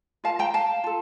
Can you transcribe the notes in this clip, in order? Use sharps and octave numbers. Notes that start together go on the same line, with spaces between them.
F4 A#4 F5 A5
G5 A#5
F5 A5
F4 A4